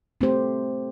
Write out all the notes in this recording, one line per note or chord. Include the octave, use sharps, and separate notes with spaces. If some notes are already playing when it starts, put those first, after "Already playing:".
A3 C4 G4 C5